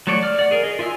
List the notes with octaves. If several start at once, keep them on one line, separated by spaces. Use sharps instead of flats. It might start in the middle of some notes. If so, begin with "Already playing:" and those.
F#3 A3 A4 C#5 D5
D5 F6
D5 F#5
G#4 A#4
G#4 D#5
F4 E5 G#5 E6